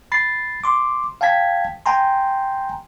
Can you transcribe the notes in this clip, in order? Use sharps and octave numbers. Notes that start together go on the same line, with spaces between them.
B5 A6 C7
C6 D6
F5 G5 A5 G#6 B6
G5 G#5 A#5 C6